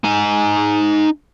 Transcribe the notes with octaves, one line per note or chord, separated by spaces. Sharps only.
D#4 G#5